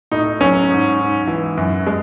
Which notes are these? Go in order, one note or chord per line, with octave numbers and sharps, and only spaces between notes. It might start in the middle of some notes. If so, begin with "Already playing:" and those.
A2 D#4
F#3 C#4
G#2
G#2
E3
F#2
G#3